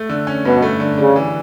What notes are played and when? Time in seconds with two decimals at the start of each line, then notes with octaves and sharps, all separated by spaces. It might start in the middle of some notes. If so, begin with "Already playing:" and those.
Already playing: A3
0.09 D3
0.27 C#4
0.45 G2 B2
0.62 A3
0.80 D3
0.98 C#3 G3
1.16 E3